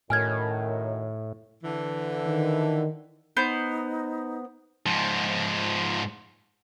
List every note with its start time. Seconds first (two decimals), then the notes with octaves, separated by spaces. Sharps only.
0.10 F#2 A2 D#3 G#5 F6 G#6
1.64 D3 E3
2.27 D#3
3.37 B3 D#4 C5 G6
4.86 G#2 F3